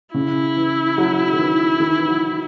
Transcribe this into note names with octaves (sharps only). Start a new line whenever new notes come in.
C#3 E4
E3
F#3
D#3
E3
D#3
E3
F#3